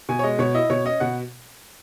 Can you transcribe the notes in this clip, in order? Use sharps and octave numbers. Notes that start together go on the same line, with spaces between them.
B2 G#5
C#5
G#3 D#5
B2 C#5
E4 D#5
B2 C#5
C#4 D#5
B2 F#5